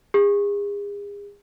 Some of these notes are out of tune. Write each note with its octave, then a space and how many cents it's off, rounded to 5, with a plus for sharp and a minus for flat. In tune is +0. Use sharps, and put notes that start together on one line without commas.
G#4 -40